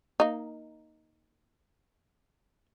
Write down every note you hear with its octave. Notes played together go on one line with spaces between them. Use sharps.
A#3 D#4